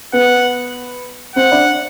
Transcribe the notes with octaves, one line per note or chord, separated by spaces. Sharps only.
B3 B4 F#5
C4 C5 F#5
D4 D5